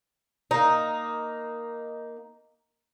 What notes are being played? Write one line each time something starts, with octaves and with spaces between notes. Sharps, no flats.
A#3 D#4